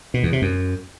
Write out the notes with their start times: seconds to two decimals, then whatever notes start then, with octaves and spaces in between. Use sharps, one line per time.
0.14 B2
0.23 E2
0.33 C3
0.42 F#2